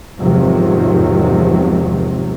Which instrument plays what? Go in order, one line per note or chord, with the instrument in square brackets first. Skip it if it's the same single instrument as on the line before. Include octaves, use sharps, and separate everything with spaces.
[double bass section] E2 G#2 C3 D#3 F3 F#3